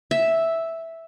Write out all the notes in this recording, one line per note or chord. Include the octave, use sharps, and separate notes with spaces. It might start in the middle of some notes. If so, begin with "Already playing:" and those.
E5